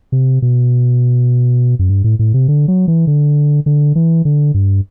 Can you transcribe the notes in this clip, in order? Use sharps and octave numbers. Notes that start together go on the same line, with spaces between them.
C3
B2
F#2
G2
A2
A2
C3
D3
F#3
E3
D3
D3
E3
D3
G2